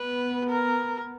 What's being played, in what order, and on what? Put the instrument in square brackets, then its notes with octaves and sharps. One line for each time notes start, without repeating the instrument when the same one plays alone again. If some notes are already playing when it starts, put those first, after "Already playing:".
Already playing: [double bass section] B3 [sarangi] B4
[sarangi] A#4